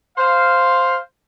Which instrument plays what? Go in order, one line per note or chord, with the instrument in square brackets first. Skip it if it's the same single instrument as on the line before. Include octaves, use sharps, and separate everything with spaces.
[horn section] C5 F5